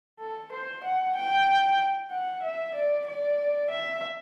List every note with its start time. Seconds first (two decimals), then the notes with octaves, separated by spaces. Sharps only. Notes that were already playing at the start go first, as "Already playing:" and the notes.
0.20 A4
0.52 C5
0.83 F#5
1.15 G5
2.11 F#5
2.42 E5
2.74 D5
3.06 D5
3.70 E5